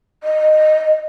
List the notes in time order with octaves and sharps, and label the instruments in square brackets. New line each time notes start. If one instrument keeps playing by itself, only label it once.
[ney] D#5